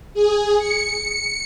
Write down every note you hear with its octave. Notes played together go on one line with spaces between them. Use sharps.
G#4
C#7